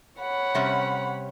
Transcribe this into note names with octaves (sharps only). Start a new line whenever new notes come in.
C#5 F#5 B5
C3 G3 C#4